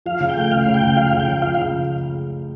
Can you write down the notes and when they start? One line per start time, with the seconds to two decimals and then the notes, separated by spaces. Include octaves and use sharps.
0.06 F3 F5
0.20 C#3
0.29 G5
0.36 A3
0.51 C#2 F5
0.66 C#3
0.74 G5
0.82 C#2
0.96 F3 F5
1.12 C#3
1.20 G5
1.28 C#3
1.42 F3 F5
1.54 F5
1.57 C#3